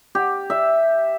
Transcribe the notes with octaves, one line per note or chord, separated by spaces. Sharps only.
G4
E5